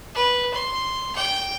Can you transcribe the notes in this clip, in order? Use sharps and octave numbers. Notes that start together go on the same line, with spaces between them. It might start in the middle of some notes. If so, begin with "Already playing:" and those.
B4
C6
G5